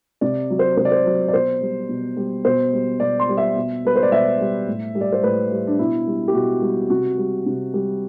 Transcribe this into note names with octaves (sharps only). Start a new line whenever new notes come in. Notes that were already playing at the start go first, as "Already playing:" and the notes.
C3 D5
F#3
C5
C3 C5
D5
C5
F#3
D5
B2 C5
G3
B2
G3
B2 C5
G3
B2 D5
C6
G3
E5
B2
G3 B4
C5
D5
B2 E5
G3
A2
G3
D5
C5
A2 B4
G3
D4
B2 E4
G3
G4
B2 F#4
G3
C3 F#4
G3
C3
G3